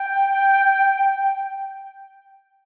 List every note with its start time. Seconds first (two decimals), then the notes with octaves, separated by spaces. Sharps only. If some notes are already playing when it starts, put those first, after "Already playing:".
Already playing: G5